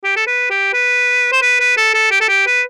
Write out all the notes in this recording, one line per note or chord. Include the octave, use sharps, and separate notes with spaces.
G4
A4
B4
G4
B4
C5
B4
B4
A4
A4
G4
A4
G4
B4